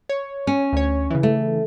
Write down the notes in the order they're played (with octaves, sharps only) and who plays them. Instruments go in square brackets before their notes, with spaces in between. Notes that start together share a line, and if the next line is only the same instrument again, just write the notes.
[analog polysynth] C#5
[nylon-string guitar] C#4
[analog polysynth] D2 C#5
C#3 E3
[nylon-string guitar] A3